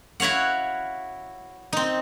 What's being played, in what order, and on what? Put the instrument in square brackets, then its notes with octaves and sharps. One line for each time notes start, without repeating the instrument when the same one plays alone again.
[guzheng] E4 F#4 C#5 F5 F#5
C4 D#4